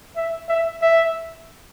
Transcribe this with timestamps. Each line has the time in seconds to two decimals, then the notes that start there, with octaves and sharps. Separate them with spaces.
0.16 E5
0.48 E5
0.82 E5